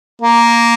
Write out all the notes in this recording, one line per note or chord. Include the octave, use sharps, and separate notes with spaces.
A#3